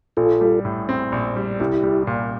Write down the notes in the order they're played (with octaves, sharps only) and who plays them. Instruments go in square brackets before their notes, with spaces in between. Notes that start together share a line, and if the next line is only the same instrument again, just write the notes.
[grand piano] A#1 [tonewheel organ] F4 A4
[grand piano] G3
A2
C4
A#1
G3
[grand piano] C2 [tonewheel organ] E4 G4
[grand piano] G3
A#2